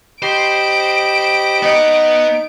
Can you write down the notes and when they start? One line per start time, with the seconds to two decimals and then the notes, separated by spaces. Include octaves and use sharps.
0.22 G4 C5 D#5 B5 D7
1.63 B3 D#4 F#5